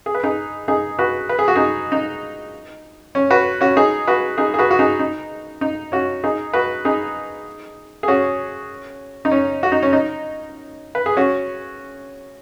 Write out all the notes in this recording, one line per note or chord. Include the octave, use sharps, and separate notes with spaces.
G#4
B4
D#4 G#4
D#4 G#4
F#4 B4
B4
G#4
F#4
D#4 G#4
D#4
C#4
F#4 B4
C#4 F#4
D#4 G#4
F#4 B4
D#4 G#4
G#4
F#4 B4
F#4
D#4 G#4
D#4
D#4
C#4 F#4
D#4 G#4
F#4 B4
D#4 G#4
G#4
C#4 F#4
D#4
C#4
F#4
D#4
C#4
D#4
B4
G#4
C#4 F#4